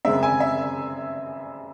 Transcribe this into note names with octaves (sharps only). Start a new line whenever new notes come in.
F#2 C#3 G#3 C4 E5
G#5
E5